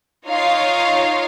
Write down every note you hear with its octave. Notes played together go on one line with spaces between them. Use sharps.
D#4 F4 C#5 D#5 F5